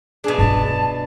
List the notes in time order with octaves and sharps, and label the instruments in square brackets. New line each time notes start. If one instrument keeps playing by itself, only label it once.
[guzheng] B2 D4 [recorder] G#4
[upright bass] G2 F4 [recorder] A5